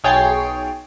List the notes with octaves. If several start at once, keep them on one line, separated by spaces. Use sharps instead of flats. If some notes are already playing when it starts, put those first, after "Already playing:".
B1 G#4 C#5 G5 A6 C7